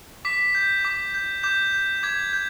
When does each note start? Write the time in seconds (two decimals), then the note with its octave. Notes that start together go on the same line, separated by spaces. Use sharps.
0.25 D6 B6
0.55 G6
0.85 D6
1.14 G6
1.43 D6 G6
1.73 G6
2.03 D6 G#6
2.33 G6